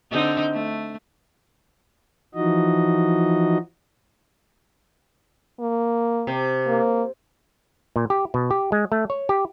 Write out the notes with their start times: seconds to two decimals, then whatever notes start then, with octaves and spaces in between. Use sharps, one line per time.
0.11 D3 C4 D#4
0.53 A3
2.35 E3 F3 D#4 F#4 D#5
5.60 A#3
6.27 C3
6.67 A#3
7.96 A#2
8.10 G4
8.34 B2
8.51 G4
8.72 G#3
8.92 A3
9.10 C#5
9.29 G4